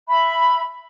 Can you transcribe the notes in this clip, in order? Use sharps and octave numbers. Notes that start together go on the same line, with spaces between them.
E5 B5